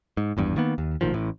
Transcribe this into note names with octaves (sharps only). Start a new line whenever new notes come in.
G#2
G#1 E2 G2
D#3 A#3 B3
D#2
A1 A#2 D#3 F3
A1 A2